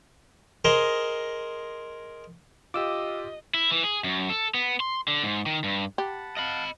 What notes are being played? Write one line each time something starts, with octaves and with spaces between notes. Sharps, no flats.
G#4 A#4 C5 D#5
F4 G4 D#5 D6 E6
E4
E3
G#4
F#2
A4
B3
C6
D3
G#2
D#3
G2
G4 F#5 A5 B5
D#5 F5 F#5 A5 B5